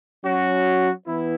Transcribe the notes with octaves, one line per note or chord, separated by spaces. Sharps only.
F#3 C#4 F#4
E3 B3 E4